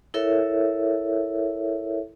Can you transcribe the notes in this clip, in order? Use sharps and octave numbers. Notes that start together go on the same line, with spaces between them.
E4 A4 A#4 C#5 E5